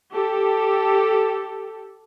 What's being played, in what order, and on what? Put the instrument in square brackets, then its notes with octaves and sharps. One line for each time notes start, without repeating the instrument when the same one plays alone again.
[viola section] G4 A4